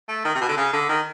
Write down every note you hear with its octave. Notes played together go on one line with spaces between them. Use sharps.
A3
D#3
C3
B2
D3
C#3
D3
D#3